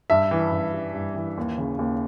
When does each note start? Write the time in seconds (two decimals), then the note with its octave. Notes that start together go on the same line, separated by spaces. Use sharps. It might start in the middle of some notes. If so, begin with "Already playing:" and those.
0.10 G2 E5
0.31 E3
0.52 G2
0.73 G3
0.94 G2
1.16 E3
1.38 D#2
1.58 C#3
1.79 D#2